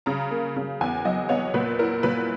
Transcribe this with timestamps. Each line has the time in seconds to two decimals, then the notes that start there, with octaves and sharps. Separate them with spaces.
0.06 C#3 A#5
0.31 A#3
0.56 C#3
0.81 E2 G#5
1.05 F#3 D#5
1.29 B3 C#5
1.54 A#2 B4
1.79 E4 A#4
2.03 A#2 B4